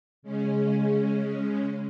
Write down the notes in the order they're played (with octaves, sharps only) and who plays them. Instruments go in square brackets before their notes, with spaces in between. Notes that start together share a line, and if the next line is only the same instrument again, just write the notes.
[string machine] C#3 G#3 C#4